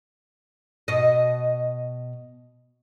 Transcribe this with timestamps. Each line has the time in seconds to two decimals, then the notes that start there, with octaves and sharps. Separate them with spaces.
0.88 B2 D#5